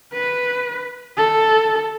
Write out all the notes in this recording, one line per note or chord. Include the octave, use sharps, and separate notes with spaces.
B4
A4